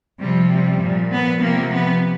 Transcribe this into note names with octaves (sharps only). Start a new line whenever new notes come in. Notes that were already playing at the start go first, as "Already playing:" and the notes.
C3 F3 G3
G3
A#2 F3
B3
C3 F3 A#3
B3